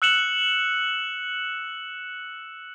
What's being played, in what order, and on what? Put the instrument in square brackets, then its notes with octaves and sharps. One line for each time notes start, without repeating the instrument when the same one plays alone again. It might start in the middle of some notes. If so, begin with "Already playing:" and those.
[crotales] E6 F#6 C#7 E7 F#7